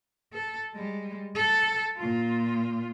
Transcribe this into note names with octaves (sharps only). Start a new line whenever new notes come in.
A4
G3 G#3
A4
A#2 F4